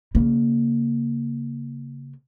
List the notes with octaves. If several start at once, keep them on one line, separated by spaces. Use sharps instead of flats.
C#3 A#3